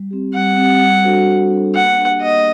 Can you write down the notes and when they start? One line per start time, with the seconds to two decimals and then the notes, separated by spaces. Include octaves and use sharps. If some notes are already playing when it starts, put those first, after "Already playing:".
Already playing: G3
0.11 C4 G4
0.35 G3 F#5
0.57 C4 G4
0.81 G3
1.04 D4 F#4 A4 C5
1.27 G3
1.50 D4 F#4 A4 C5
1.74 A#3 F#5
1.98 D4 G4
2.21 A#3 D#5